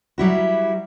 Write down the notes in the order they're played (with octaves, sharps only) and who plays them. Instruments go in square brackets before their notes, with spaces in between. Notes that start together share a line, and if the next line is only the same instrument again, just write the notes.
[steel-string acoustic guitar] F#3 G3 E4 F#4